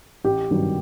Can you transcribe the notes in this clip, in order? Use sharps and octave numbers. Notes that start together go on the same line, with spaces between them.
A1 G4
G2 D#3 F#3